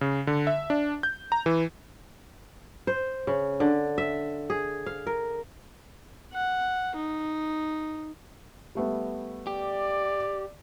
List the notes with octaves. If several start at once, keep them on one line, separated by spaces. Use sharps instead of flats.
C#3
D3
E5
D4
G6
A#5
E3
C5
C#3
D3
E5
G#4
F5
A#4
F#5
D#4
G3 A3 B3
G4 D5